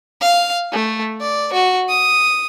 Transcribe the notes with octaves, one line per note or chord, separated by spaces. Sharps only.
F5
A3
D5
F#4
D#6